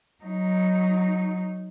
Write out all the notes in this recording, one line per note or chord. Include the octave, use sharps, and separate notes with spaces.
F#3 D#4